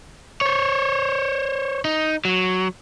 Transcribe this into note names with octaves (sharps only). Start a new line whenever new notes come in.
C5 C#5
D#4
F#3